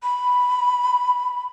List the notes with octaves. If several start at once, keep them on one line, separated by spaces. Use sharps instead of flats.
B5